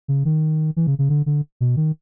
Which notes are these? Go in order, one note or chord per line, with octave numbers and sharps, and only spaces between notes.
C#3
D#3
E3
C#3
C#3
D3
D3
B2
D#3